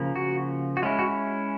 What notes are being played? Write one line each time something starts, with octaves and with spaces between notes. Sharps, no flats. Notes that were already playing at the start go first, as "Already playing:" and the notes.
Already playing: C#3 F3 A#3
F#4
F#4
G#3 C#4 E4 F4
F#4